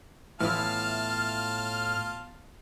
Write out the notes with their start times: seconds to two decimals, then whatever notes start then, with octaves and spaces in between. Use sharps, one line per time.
0.40 A2 E3 B3 E4 F4 F5 A5 F6